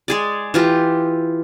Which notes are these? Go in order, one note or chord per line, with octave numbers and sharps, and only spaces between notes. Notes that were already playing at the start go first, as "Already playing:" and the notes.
G#3 G#4 D5
E3 F4 G4